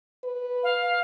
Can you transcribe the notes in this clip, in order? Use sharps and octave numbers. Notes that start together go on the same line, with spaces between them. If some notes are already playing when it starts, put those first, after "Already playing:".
B4
F5